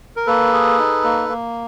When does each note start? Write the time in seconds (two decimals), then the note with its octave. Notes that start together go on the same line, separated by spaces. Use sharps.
0.17 A#4
0.27 A#3 A4 B4
0.53 G#4
0.78 D#4
1.04 A#3
1.29 A#3